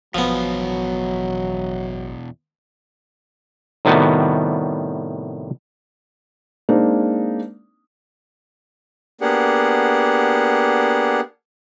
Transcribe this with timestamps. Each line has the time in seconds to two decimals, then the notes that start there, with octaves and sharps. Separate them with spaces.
0.15 A1 E2 B2 F3 F#3 B3
3.85 A2 C3 D#3 G3 B3 F#4
6.69 G#3 A#3 C4 D4 D#4
9.21 A#3 B3 D4 G4 G#4 F#5